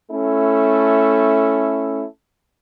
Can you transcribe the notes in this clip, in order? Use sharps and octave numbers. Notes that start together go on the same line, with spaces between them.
A3 C#4 E4 A4